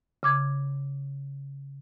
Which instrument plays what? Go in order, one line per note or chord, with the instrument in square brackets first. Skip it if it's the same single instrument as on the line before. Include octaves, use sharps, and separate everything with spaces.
[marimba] C#3 D6 G#6